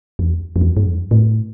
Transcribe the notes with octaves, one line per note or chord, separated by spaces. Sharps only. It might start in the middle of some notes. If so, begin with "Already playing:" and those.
F2
E2
F2
E2
G2
F2
A2